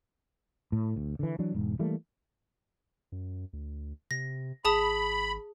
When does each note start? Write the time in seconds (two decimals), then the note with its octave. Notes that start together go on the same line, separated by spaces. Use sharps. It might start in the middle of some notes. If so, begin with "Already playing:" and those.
0.72 A2
0.96 D2
1.19 D3 E3
1.39 E3 F#3 D4
1.54 E1 G#2
1.79 E3 G3 A3 A#3
3.12 F#2
3.53 D2
4.11 C3 A#6
4.65 G#1 G#4 A5 B5 D#6